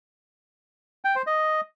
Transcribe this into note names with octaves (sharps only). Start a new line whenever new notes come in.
G5
C5
D#5